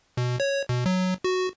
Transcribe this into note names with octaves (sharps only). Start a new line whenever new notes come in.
B2
C#5
B2
F#3
F#4